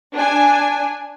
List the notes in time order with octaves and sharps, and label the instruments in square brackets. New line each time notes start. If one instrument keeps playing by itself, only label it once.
[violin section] D4 G#5